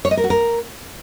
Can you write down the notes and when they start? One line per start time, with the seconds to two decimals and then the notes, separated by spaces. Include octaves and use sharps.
0.05 C#5
0.11 D#5
0.17 A#4
0.24 F#4
0.30 A#4